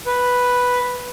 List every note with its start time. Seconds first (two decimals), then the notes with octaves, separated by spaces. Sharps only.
0.06 B4